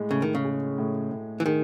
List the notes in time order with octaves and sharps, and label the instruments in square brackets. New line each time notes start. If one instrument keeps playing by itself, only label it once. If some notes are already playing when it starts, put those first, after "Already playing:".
Already playing: [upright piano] A2 G#3
[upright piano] A2 [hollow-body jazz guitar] C#3
[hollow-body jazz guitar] D#3
C#3
[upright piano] G#4
A2
A2
[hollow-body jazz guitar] E3
[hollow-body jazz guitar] D#3 [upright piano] G#4